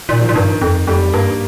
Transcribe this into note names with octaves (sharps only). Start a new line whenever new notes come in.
A#2 D#3
F3
A#2
G2 D#3
F2
F2 G3
G2 A#3